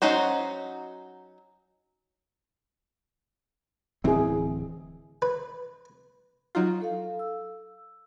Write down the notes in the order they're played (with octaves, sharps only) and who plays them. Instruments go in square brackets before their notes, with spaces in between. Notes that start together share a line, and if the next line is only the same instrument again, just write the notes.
[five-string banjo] F#3 C#4 D#4 F#4 C5
[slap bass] D1 E3 C4 [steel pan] E4 G#4
[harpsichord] B4
[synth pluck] F#3 D#4 F4
[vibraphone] A4 F5
E6